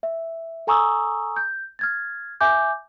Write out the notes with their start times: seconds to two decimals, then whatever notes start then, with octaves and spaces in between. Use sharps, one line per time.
0.03 E5
0.67 A4 G#5 A#5 C#6 D#6 E6
1.36 G6
1.79 F6 G#6 A6
2.41 E5 G#5 D6 G6